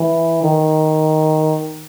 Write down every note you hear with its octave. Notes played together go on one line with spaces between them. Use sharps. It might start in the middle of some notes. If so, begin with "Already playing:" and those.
Already playing: E3
D#3